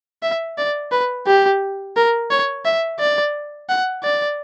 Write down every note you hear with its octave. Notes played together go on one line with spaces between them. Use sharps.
E5
D5
B4
G4
A#4
C#5
E5
D5
F#5
D5